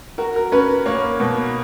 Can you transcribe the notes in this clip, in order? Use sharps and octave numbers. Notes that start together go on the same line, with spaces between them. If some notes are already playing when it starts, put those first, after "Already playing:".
F#4 A#4
A#4
C#4 B4
A#3 C#5
B2